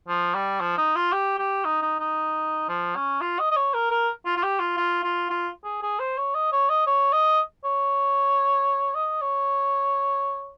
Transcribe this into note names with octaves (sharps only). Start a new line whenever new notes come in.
F3
G3
F3
D#4
F4
G4
G4
D#4
D#4
D#4
F3
C#4
F4
D#5
D#5
C#5
A#4
A#4
F4
F4
G4
F4
F4
F4
F4
G#4
G#4
C5
C#5
D#5
C#5
D#5
C#5
D#5
C#5
D#5
C#5